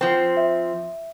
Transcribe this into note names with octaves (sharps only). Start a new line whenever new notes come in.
F3 C4
E5